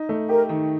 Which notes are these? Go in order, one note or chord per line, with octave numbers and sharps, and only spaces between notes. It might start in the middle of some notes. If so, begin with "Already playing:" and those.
Already playing: D#4
A3
G4 A#4
D#3